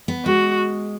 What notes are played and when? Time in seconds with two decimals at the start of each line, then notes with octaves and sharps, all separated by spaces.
0.08 B3
0.25 G#3 F#4